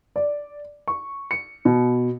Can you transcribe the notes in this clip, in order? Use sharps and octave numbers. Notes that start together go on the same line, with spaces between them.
D5
C#6
C#7
B2